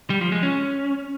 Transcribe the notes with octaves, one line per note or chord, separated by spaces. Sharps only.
G3
F3
G#3
C#4